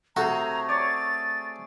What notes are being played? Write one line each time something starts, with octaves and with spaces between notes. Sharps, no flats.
C3 A3 F#4 G#4 A4 A#5
C#5 D5 A6